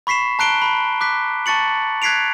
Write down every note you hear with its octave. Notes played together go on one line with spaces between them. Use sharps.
B5 C#6 B6 C7 E7
A5 A#5 F#6 C7 D7 G7
B5
D6 F#6 B6
A5 C#6 A6 C#7 F#7
F#6 G#6 B6 C7 D7 F7